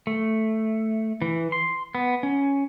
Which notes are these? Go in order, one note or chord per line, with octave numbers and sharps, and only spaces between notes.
A3
E3
C6
B3
C#4